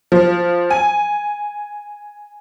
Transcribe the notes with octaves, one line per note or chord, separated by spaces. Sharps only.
F3
G#5